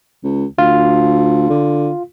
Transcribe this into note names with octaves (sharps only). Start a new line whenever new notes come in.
C#2
D2 F4
D3